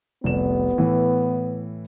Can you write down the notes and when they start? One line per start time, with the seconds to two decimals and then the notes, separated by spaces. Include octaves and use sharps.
0.24 F1 C2 B3 E7
0.78 A2 E3